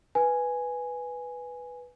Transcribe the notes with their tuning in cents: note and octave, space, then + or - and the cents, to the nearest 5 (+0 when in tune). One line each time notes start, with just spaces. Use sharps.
B4 +0 G#5 +0